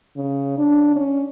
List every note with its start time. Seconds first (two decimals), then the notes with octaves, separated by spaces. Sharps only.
0.17 C#3
0.58 D4
0.96 C#4